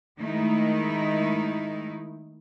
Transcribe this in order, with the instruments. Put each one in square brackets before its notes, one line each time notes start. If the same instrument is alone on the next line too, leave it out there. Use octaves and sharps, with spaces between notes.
[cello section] D#3 G#3 A3 D#4 E4